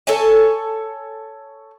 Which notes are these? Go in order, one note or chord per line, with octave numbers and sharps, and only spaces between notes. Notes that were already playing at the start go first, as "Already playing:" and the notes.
A4 C#5 G#5 A5